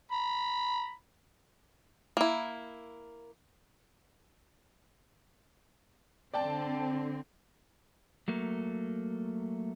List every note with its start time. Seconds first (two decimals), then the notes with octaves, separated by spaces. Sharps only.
0.12 A#5 B5
2.17 A#3 E4
6.34 D3 C4 D5 G5 A5
8.28 F#3 A3 A#3